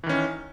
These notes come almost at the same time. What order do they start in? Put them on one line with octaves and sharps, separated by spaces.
E3 D#3 C#4